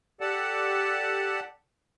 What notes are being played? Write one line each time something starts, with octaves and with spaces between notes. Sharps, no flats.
G4 A4 D5 F#5 A5